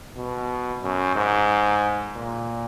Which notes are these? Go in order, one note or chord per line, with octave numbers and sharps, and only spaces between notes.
B2
F#2
G#2
A#2